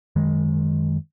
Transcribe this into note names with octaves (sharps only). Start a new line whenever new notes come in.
F#2 D#3 G#3